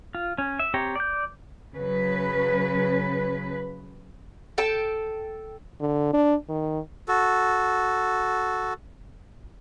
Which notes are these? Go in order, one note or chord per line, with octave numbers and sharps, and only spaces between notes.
F4
C#4
E5
C4 G4 C#5 A#5
D5 G6
C#3 F#3 B4
A4 G5 A5
D3
D4
D#3
F#4 A4